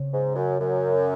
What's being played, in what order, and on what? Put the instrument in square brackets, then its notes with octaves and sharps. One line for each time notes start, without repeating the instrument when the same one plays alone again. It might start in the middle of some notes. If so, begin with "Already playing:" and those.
Already playing: [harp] C#3 C4
[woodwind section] G#2
F#2
F#2